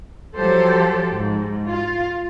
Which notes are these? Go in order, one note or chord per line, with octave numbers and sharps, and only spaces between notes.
F3 F#3 G4 A4 C5
G#2
F4